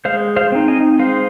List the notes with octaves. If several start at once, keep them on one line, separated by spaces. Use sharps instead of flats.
G#3 C5 F5
C5 F5
C4 D#4
D#5 G#5
G#3 C5 F5